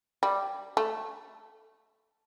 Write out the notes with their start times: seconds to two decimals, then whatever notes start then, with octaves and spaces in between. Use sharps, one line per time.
0.23 G3
0.77 A3